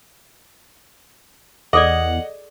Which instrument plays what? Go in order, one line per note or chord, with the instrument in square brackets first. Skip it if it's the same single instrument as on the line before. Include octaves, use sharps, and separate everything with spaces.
[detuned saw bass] E2 [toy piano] G#4 A4 D5 [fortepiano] D#5 [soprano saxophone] F#5